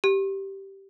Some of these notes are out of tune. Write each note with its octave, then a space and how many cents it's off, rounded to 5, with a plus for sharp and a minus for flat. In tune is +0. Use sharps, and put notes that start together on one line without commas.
G4 -10